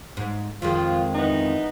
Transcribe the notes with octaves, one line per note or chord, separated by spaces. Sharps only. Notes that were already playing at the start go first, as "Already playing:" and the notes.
G#2
F2 D#3 F3 G#3 F4
E3 B3 D#4